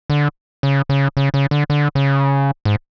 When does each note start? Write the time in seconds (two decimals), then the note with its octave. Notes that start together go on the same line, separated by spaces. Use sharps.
0.10 D3
0.63 C#3
0.89 C#3
1.17 C#3
1.34 C#3
1.51 D3
1.70 D3
1.95 C#3
2.65 G#2